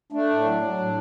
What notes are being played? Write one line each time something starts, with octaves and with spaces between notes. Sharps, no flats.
A3 D4
A2
F#3
F#3
A2